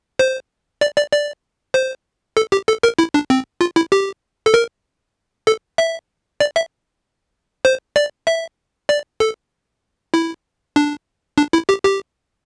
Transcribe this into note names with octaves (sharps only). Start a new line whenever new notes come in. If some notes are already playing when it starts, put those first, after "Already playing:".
C5
D5
D5
D5
C5
A4
G4
A4
A#4
E4
D4
C4
F4
E4
G4
A4
A#4
A4
E5
D5
E5
C5
D5
E5
D5
A4
E4
D4
D4
E4
G4
G4